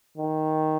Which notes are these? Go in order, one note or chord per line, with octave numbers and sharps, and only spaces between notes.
D#3